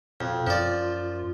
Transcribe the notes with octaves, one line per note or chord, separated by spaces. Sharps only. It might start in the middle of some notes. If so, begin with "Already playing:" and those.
F2 B2
F#2 F3 F4 D5